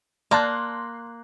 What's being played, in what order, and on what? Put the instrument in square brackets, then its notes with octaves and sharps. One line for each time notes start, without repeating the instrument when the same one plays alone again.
[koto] A#3 [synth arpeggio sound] D5 A5 [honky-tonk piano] C6 F#6